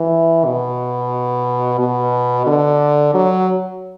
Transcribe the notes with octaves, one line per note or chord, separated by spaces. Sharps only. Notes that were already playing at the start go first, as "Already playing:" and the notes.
Already playing: E3
B2
B2
D3
F#3